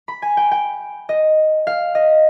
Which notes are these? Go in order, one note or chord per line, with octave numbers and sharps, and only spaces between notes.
B5
G#5
G5
G5
D#5
F5
D#5